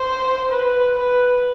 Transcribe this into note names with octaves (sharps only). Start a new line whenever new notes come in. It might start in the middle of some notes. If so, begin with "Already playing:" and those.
Already playing: C5
B4
B4